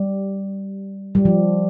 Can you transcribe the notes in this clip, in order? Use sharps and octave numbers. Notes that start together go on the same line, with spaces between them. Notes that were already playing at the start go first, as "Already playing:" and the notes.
Already playing: G3
G3
F3